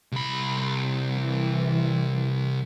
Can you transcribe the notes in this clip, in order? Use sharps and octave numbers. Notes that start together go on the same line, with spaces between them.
C2 B5
E3